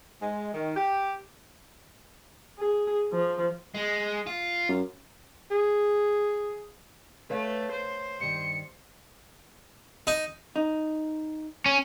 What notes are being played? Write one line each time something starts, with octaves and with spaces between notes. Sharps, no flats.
G#3
D#3
G4
G#4
F3
G#3
F4
F#2
G#4
A3 B4 C#5 F5
C5
G2 D#3 C#7
D#4
D#4
C#4